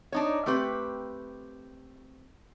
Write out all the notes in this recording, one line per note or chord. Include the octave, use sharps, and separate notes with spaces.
D4 D#4 C#5
A3 C4 G4 B4